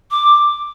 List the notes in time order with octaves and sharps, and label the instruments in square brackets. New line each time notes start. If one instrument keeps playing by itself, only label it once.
[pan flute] D6